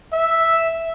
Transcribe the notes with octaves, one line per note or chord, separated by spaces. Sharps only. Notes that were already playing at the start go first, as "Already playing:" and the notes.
E5